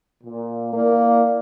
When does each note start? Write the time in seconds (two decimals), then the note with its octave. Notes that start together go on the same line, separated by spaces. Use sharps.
0.24 A#2
0.74 A#3 E4 A#4 D5